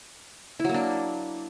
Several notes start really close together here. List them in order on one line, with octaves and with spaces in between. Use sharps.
E4 F#3 A#3 D4